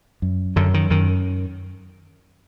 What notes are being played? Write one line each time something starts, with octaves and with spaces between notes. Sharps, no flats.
F#2
F#2 D3
D#3
F#2 D#3